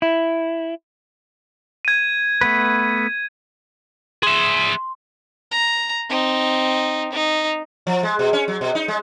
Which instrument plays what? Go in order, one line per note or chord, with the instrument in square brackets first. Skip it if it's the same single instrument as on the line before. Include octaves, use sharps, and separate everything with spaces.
[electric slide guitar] E4
[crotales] G#6 D#7
[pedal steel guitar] A3 B3 B4
[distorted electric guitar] G#4 E5 [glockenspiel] C6
[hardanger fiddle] A#5
C4 D#4
D#4
[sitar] F3
G#3
B2
C#4
F#3
B2
D#4
G#3